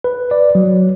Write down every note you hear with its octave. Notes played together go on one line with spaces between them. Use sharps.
B4
D5
F#3